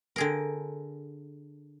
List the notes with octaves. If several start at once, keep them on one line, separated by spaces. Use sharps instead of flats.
D3 G#4 A#4